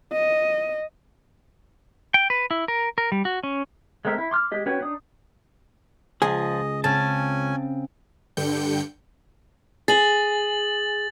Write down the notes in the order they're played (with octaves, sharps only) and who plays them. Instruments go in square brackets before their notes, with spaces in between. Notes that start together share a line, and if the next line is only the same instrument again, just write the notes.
[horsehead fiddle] D#5
[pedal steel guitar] G5
B4
E4
A#4
A#4
G3
F#4
C#4
G#3 A3 C4 A#4 E5
E4
C6 D6 F6
G#3 G4 D#5
C#4 F#4 B4 C#5 G5
D4 D#4 D#6
[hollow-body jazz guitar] C#2 G#4 [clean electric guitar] F3 [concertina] D#5
[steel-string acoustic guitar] C#3 C4 [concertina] C#4 G#5 [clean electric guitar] A5
[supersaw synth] G2 D3 G5 G6 C#7
[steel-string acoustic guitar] G#4 [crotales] A6 F#7